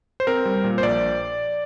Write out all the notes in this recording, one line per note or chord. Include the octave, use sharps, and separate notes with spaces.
C5
C4 A#4
G3
A#2
C5
A#1 D5